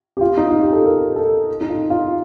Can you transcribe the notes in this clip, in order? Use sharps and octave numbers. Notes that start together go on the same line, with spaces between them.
G4
F4
D#4
F4
G4
A4
A#4
A4
D#4
F4
F4